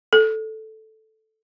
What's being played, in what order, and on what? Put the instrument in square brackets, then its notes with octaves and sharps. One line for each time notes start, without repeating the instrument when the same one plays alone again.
[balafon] A4